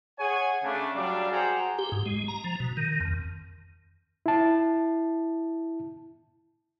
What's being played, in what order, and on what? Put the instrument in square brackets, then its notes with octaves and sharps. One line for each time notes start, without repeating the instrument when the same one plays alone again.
[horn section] G#4 C#5 F#5 G#5
C#3 A3 D4
F#3 G3 C#4 D4 D5 F5
F#4 G#4 C5 F#5 G5 A#5
[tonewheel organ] G4
G#2
G#3
A#5
F3
B2
D#3
F2
[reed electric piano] E4 A5